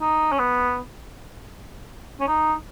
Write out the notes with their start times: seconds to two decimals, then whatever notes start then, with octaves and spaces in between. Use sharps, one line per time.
0.01 D#4
0.32 C#4
0.39 B3
2.20 C#4
2.27 D#4